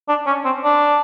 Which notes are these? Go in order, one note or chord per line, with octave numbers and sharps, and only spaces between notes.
D4
C#4
C4
D4